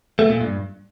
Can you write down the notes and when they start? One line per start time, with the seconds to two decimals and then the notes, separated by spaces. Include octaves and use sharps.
0.19 A3
0.30 A#2
0.41 G2